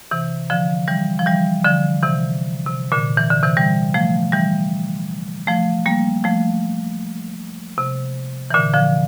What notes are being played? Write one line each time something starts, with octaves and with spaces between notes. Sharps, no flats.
C3 E3
D3 F3
E3 G3
F3
E3 G3
D3 F3
C3 E3
C3
A#2 D3
E3
D3
C3 E3
E3 G3
F3 A3
E3 G3
F3 A3
G3 A#3
F3 A3
C3
E3
A#2 D3
D3 F3